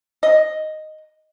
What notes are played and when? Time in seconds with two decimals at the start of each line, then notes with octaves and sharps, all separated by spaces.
0.23 D#5